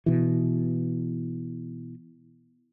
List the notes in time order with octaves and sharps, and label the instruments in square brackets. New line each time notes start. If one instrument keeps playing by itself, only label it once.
[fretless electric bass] B2 E3